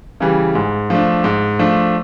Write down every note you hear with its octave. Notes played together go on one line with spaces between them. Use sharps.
C#3 E3 G3
G#2
F3 A3 D4
G#2
F3 A3 D4